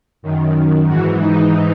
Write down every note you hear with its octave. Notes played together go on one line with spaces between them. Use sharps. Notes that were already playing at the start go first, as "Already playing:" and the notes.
F#2 D#3
G#2 E3 F#4
D#4